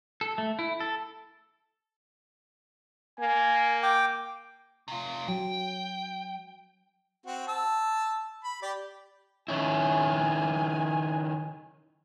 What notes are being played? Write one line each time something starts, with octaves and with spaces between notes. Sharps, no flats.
A4
A3
E4
A4
A#3 G#5
G5 D6
C3 F4
F#3 G5
C4 F#4
A5 E6
B5
G4 D5
D#3 C#4 E4 G#5